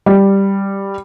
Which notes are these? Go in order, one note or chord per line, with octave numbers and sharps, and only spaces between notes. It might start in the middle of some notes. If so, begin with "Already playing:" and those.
G3